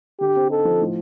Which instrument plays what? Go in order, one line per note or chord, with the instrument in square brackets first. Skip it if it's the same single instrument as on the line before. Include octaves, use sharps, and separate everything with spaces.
[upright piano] D3 [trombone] G4
[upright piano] C4
[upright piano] D#4 [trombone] A4
[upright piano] F3
A2